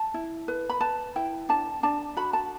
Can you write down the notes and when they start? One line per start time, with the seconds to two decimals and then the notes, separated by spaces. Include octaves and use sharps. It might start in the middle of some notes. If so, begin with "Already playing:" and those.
Already playing: A5
0.14 E4
0.48 B4
0.69 B5
0.81 B4 A5
1.16 E4 G5
1.49 D4 A5
1.83 D4 A5
2.17 F#4 B5
2.33 A5